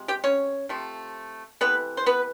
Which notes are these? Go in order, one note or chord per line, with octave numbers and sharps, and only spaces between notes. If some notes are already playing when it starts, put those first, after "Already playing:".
Already playing: C3 F3 G#3
G4 G5
C#4 C#5
C3 F3 A3
C3 E3 A3 B3 B4
C5
B3 B4